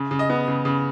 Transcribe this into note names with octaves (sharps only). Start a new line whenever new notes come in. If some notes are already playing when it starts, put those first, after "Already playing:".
Already playing: C#3
C#3
D#5
B3
C#3
C#3